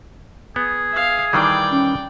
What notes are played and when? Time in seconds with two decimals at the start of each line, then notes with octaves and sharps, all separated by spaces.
0.56 B3 G#4
0.92 E5 F5
1.33 D#3 E3 G3 D5 G5
1.70 C#4